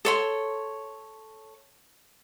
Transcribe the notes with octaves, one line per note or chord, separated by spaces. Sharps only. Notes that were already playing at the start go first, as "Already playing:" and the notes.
A4 C#5 C6